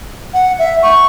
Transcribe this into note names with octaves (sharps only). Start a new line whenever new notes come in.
F#5
E5
C#6